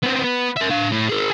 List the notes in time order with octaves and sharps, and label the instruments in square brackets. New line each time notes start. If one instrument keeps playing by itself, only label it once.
[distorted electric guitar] B3 C4
B3
A#4 E5
D4 F5
A2
G#4 A#4